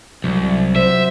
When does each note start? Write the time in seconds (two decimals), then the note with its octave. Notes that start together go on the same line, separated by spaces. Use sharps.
0.24 C2 F#3
0.76 F#4 C5 E5